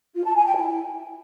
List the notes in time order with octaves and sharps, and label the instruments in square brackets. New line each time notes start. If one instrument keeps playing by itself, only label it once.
[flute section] F4
A5
G#5
G5
E4